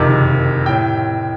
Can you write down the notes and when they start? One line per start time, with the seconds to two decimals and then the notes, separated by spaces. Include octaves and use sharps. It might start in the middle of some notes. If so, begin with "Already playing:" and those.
Already playing: F#1 F2 C3 D#3
0.66 A2 G5